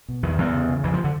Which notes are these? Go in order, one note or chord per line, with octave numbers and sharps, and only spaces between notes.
B2
E2 D#3
E2
C#3
C#3
F2 E3
F3
D3